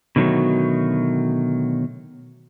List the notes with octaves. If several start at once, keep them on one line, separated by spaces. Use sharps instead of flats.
B2 D3 D#3 F#3 A3